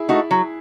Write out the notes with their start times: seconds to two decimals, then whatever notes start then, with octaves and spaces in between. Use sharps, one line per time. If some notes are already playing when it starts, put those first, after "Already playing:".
Already playing: E4 G#4
0.09 A3 D#4 F#4
0.31 F#3